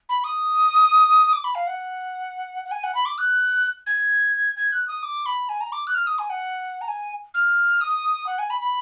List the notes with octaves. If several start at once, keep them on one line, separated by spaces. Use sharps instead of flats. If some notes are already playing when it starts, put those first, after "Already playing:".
B5
D#6
D6
B5
F5
F#5
F#5
G#5
F#5
B5
D6
F#6
G#6
G#6
F#6
D#6
D6
B5
G#5
A#5
D6
F#6
F6
D#6
G#5
F#5
A#5
G#5
F6
D#6
F#5
G#5
B5
B5